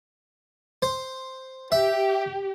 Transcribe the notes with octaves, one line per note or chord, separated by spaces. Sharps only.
C5
G4 E5